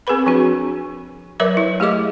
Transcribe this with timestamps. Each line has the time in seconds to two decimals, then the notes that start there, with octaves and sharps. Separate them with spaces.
0.07 C4 G#4 A#4 B4 B5
0.26 F3 C4 D4 F#4
1.40 F#3 A#4 B4 C#5 E5 D6
1.57 E4
1.80 A3 G4 G#4 D#5 D6